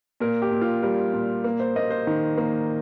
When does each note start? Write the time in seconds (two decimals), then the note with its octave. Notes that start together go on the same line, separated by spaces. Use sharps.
0.20 A#2 A#4
0.42 G4
0.51 A#2
0.61 F4
0.83 G3 A#4
1.13 A#2
1.44 A#3
1.60 C5
1.76 A#3 D#5
1.91 C5
2.07 D#3
2.38 A#3